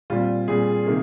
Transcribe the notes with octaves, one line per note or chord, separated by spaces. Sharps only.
A#2 G3 C4 F4
A#2 G3 C4 G#4
C3 D#3 A#3